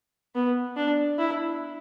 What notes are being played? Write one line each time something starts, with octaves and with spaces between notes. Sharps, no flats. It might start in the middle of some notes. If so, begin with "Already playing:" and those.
B3
D4
E4